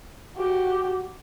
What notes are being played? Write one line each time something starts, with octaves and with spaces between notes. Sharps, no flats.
F#4 G4